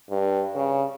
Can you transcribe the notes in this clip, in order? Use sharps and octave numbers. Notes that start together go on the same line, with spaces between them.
G2
C#3